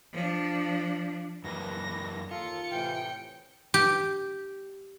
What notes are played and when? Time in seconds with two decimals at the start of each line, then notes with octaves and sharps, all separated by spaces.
0.12 F3 D4
1.44 F#2 E3 A#3 B4 A#6
2.31 D#2 A#3 F4 A4 C#7
2.71 A2 C3 E3 G5
3.74 G4